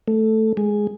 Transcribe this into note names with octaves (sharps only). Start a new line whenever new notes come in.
A3
G#3